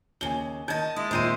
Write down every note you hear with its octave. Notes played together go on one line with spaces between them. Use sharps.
D#2 C#3 G#5 G7
D#3 D#5 A5 G6 G#6
G#3 E4
A#2 D#3 C4 E4 C5 D#7